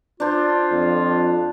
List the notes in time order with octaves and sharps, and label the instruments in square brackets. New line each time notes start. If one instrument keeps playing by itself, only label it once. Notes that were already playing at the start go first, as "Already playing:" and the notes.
[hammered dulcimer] D4 C5 [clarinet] F4
[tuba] F2